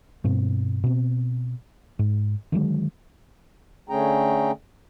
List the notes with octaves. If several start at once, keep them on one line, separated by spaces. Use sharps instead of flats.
G2 B2 C4
B2 C4
G#2
D3 D#3 F#3 G#3
D3 A3 C#4 G#4 G5 A#5